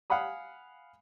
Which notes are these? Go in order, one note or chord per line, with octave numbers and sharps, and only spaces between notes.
F5 F#5 G#5 B5 D#6